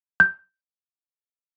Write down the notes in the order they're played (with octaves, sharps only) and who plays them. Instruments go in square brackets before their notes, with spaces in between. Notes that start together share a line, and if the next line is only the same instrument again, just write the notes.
[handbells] G6